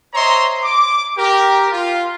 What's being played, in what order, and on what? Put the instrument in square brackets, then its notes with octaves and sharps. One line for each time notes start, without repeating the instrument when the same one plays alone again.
[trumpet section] C5 C#5 D#5 E5 A#5 C6
D6
G4 A#4
F4